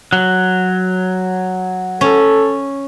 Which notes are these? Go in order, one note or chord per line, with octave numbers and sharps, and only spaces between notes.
F#3
C#4 A4